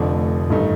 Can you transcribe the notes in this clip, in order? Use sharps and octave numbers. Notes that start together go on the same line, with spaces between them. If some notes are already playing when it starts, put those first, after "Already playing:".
Already playing: F1 F2 D3 A3 D4
A1 G2 D#3 A3 D#4